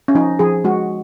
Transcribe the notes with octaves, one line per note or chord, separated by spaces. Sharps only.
C#4
F3 D#4
F3 G#4
G#3 F#4